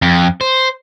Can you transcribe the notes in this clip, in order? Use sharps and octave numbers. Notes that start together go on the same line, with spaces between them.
F2
C5